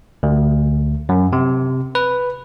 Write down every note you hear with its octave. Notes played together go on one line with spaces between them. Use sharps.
D2
F#2
C3
B4